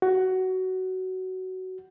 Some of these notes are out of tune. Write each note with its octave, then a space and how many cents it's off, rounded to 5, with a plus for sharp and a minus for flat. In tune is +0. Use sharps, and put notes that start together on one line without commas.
F#4 +15